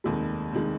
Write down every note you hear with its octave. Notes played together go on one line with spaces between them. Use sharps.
F1 D#2 D#3 G#3
F1 D#3 G#3